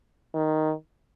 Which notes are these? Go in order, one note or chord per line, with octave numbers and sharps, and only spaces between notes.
D#3